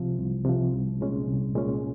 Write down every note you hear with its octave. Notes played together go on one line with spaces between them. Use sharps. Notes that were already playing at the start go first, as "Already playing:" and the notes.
Already playing: C2 C3 F3
C2
C3 F3
C2
A#2 G#3 C#4
C2
A#2 G#3 C#4